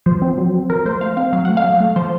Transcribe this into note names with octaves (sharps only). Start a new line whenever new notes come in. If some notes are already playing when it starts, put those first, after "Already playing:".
F3 C5
C4
F#3
C4
F3 A#4
A3 C5
A3 F5
C4 F5
F#3 F5
A3 F#5
F5
F#3
A3
F3 C5